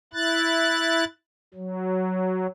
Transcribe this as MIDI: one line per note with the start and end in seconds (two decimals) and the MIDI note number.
0.13 1.04 64
0.13 1.04 90
0.13 1.04 93
1.54 2.47 54